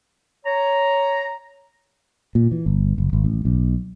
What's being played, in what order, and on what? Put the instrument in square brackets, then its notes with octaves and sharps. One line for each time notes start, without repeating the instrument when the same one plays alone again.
[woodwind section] C#5 A#5
[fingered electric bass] A#2
E3
G1
F#1
G#1
A1
B1